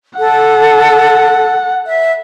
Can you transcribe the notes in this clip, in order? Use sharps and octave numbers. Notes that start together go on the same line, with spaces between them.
A4 F#5
E5